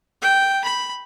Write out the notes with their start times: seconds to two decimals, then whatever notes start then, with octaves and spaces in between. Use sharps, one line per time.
0.22 G5
0.64 B5